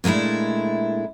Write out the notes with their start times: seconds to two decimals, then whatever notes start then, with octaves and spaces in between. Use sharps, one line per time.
0.04 A#2 G#3 A3 D4 E4